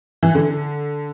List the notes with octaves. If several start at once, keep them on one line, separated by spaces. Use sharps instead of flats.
E3
D3